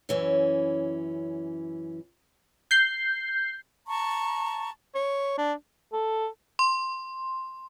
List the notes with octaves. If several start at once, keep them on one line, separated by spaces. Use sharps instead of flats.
F#2 E3 C#4
G6 C7
A5 A#5 C#6
C#5
D4
A4
C6